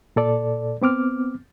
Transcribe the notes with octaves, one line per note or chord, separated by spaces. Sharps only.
A#2 A4 D5
B3 C4 D6 F6